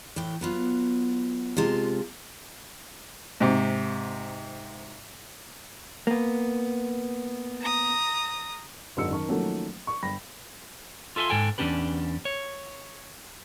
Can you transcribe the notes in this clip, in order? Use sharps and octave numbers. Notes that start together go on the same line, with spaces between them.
A2 E3 G5
F#3 B3 F4
C3 G#3 F4 A5
G#2 C3
A#3 B3
A#5 D#6
F#1 G#2 D3 F#3 E6 C#7
F#2 D#3 A#4 A5 C#6
D#3 F3 F#3 A3 A#3 C#4
C#6
G1 G5 B5 A#6
F4 A4 E5 G#5 C6
G#2 A4 G5 G#5
E2 B2 C#4 D4 G4 B4
C#5